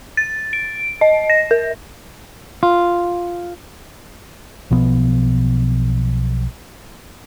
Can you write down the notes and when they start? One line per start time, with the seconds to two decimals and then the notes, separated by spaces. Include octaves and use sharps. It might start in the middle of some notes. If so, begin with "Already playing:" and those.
0.17 A6
0.53 D7
1.01 D#5
1.30 A#6
1.51 A#4
2.63 F4
4.71 B1 B2 F3 B3